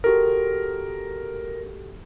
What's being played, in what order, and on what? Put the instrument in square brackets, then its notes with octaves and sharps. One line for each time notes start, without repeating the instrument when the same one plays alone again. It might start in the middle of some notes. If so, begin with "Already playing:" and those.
[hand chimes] F#4 G4 A4 [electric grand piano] A#4